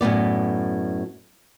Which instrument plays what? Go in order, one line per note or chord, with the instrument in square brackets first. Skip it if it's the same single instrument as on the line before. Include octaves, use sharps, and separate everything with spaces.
[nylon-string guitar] F#2 A2 B3 D5